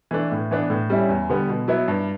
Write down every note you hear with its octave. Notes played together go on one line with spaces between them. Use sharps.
E3 A3 D4
A2
E3 B3 D4
A2
G3 C#4 E4
E2
D3 G3 B3
B2
F#3 B3 E4
G2